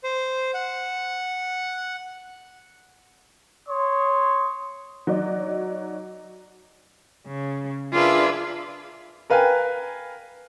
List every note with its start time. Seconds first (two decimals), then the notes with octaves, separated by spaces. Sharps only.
0.04 C5
0.54 F#5
3.67 C#5 C6 D#6
5.07 F#3 D#4 D5
7.28 C#3
7.94 D4 F4 G#4 A#4 B4 E5
9.30 A#4 B4 F5 G5 G#5